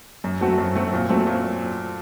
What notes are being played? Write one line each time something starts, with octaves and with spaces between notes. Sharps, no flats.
F#2
F#3 A3 C4 F#4
F#2
F#3 A3 C4 F#4
A#2
F#3 A3 C4
A#2